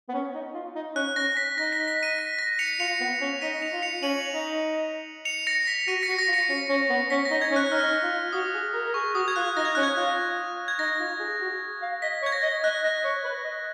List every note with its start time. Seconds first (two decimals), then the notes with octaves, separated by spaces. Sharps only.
0.09 B3
0.14 C#4
0.34 D#4
0.54 F4
0.75 D#4
0.96 C#4 F#6
1.16 C#4 A#6
1.37 B6
1.57 D#4 A#6
1.73 B6
1.88 B6
2.03 B6 D#7
2.19 B6
2.39 A#6
2.59 C#7 F7
2.80 F4 C#7 F7
3.00 B3
3.21 C#4
3.41 D#4 B6 D#7
3.61 C#7 F7
3.73 F4
3.82 C#7 F7
4.02 C#4 D#7 F#7
4.34 D#4
5.25 C#7 F7
5.47 A#6 C#7
5.67 B6
5.87 F#4 B6 D#7
6.03 A#6 C#7
6.08 F#4
6.19 A#6
6.28 F4
6.33 A#6 C#7
6.49 C#4
6.69 C#4
6.90 B3
7.10 C#4 B6
7.25 A#6
7.31 D#4
7.42 G#6
7.52 C#4
7.56 F#6
7.71 D#4 F6
8.03 F4
8.33 F#4 D#6
8.54 G#4
8.74 A#4
8.85 A#4
8.94 G#4 C#6
9.15 F#4 D#6
9.28 G#6
9.36 F4 F#6
9.57 D#4 A#6
9.65 G#6
9.75 C#4 F#6
9.83 G#6
9.96 F4
10.68 G#6
10.79 D#4 A#6
11.00 F4
11.20 G#4
11.41 F#4
11.82 F5
12.02 D#5 B6
12.22 C#5
12.26 G#6
12.32 A#6
12.43 D#5
12.63 D#5 F#6
12.83 D#5
13.04 C#5
13.25 B4
13.45 D#5